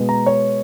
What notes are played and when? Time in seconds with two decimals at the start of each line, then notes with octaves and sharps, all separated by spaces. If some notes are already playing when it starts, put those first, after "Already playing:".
Already playing: B2 G#3 B3
0.09 A#5
0.26 C#5